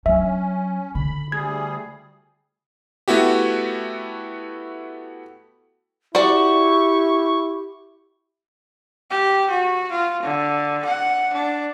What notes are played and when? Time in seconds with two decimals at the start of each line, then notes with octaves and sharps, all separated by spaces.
0.06 F#3 C#4 D4 E5
0.95 D3 B5
1.32 D2 G3 G#4 G#6
3.08 A3 B3 E4 F#4 G4
6.15 E4 F#4 G4 D5 C#6
9.10 G4
9.50 F#4
9.91 F4
10.23 D3
10.85 F#5
11.34 D4